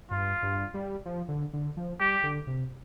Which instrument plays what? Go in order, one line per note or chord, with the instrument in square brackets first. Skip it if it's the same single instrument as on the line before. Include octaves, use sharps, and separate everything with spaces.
[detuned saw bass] G2 [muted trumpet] F4
[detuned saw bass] G2
G3
F3
D3
D3
F3
[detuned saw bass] G3 [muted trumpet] G4
[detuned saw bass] D3
C3